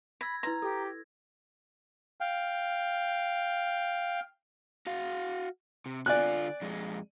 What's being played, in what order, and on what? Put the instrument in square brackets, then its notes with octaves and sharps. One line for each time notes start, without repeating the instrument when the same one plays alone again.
[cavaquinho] B5 [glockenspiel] E6 G#6 A#6
[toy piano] E4 B4 C6 [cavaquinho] A#5
[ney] G4 [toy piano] A4
[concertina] F5 G5
[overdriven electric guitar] F#4 F5
C3
[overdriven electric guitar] D3 F4 [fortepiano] D5 G#5 F#6
[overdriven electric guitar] F2 G#3